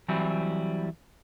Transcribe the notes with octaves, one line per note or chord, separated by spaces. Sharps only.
E3 F#3 G3 C4 E4